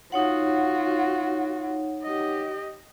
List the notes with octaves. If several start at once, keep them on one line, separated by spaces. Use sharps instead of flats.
D#4 F4 F#4 C#5 F#5
G4 D#5